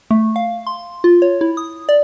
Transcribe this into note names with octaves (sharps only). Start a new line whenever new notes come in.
A3
F5
C6
F4
C#5
E4
D#6
D5